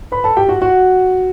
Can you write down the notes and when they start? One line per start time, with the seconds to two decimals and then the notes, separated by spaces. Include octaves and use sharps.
0.12 B4 B5
0.24 A4 A5
0.37 G4 G5
0.49 F#4 F#5
0.61 F#4 F#5